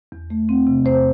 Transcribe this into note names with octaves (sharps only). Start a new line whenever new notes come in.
E2
A3
C4
C3
E2 C5